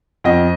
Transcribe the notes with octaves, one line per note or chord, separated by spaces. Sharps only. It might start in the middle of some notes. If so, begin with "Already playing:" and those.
F2 D#5